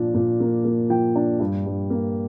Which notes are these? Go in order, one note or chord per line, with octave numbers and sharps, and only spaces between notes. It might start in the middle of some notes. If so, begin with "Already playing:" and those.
Already playing: A#2 F3 D4
A#2
A#3
A#3
F3 G5
D4
G2
G2
A#3